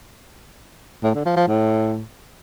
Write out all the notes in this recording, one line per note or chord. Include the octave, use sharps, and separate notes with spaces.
A2
D3
F3
F3
A2